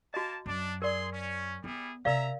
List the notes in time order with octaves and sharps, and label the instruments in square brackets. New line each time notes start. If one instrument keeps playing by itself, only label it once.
[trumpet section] A#3 A5 [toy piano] F#4 D#5
[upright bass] F#2 [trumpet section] D4
[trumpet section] G#4 C6 [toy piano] A#4 D5
[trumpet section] C#4
[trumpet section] G3 E4 G#4 [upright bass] B3
[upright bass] C3 [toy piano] A#4 D5 F5 [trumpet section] E5 A#5